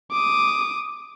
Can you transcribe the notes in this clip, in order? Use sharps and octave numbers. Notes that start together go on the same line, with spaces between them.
D6 D#6